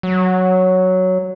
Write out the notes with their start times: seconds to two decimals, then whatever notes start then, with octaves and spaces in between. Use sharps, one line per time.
0.03 F#3